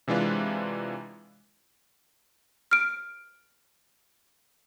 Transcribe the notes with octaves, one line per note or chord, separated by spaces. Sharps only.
C3 E3 G#3 D4 F4 B4
F6 D7